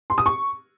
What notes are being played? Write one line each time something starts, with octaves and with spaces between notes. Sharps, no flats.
C6
D#6
C#6